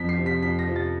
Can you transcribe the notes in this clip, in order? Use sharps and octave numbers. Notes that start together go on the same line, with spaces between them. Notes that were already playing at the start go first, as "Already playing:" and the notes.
Already playing: F2 B6
C7
C3 F3
B6
F2 B6
A#6
C3 F3
A6